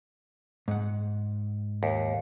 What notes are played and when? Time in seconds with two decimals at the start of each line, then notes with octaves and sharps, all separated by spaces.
0.68 G#2 F#5
1.83 D#2